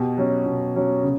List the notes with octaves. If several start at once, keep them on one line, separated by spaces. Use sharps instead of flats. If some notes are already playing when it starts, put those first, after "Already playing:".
Already playing: B2 G4
F#3 C#4
B2
F#3 C#4
C#3